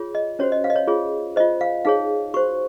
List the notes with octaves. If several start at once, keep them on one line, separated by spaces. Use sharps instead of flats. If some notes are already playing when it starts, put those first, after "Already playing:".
Already playing: F4 G#4 C#5
D#5
C#4 F#4 C5 C#5
D#5
F5
D#5
C#5
F4 G#4 C#5
F4 C5 D#5
F5
D#4 G#4 C#5 F5
F#4 C5 C#6